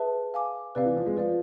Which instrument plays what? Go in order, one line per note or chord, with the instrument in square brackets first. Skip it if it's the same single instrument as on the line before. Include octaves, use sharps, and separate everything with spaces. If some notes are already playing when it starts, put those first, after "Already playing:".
Already playing: [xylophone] G#4 B4 E5 A5
F5 G#5 D6
[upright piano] C3 [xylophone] B4 D5 F5
[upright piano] E3
F3
G#3
[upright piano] F3 [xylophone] B4 D5 F5